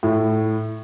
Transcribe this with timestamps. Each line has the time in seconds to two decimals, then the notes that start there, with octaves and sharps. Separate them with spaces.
0.03 A2